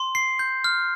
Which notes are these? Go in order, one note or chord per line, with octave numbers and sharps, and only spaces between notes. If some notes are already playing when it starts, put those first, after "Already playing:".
Already playing: C6
C7
G6
F6